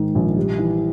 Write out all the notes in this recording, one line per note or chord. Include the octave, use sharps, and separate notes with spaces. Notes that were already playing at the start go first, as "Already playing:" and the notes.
Already playing: G#2 D#3
A#1
G3
E3